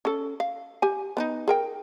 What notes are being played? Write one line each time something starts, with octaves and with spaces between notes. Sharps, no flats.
C#4 A4
F5
G4 G#5
B3 D4 D#4
G#4 A#4 G5